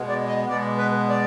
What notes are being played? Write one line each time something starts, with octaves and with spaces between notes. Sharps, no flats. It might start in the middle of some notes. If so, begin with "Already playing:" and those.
Already playing: B2 G#3 B3
D5
D#5
B2 G#3 B3 D5
B4
D5